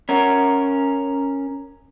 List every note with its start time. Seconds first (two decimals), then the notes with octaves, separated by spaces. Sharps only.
0.09 C#4 A#4